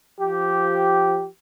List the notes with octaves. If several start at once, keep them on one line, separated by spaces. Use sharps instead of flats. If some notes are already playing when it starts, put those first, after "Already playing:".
F3 G4